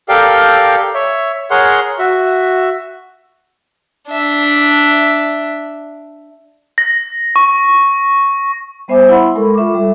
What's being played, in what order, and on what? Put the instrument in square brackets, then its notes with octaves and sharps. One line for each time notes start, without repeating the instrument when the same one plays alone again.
[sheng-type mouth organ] G4 A4 A#4 D5 F5 G5
C#5 E5
G#4 A#4 C#5 F#5 C6
F#4 E5
[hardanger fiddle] D4 E5
[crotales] A#6
C#6
[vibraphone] G3 B3 C5 E5 G#5 D6
E4 F#5 B5 C6 E6
G#3 A4 A#4 B5 C#6
F4 E5 C#6 D6
G3 A4